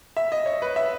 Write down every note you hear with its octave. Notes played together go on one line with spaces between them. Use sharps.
E5
D#5
C#5
B4
E5